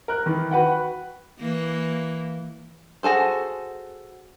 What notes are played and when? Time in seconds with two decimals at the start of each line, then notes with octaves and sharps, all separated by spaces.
0.08 A#4 F#6
0.26 D#3 E3
0.51 F#4 B4 F#5 G5
1.39 E3 A#3
3.03 F#4 G#4 A4 C5